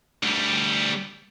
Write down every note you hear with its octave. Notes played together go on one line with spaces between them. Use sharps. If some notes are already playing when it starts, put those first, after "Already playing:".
D2 G3